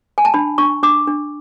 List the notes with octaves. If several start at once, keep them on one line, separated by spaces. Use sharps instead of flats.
G#5
A5
D4 B5
D4 C#6
D4 D6
D4